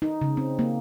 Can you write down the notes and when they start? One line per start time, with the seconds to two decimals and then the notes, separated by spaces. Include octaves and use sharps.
0.02 D#4
0.21 C#3
0.37 C4
0.59 A#3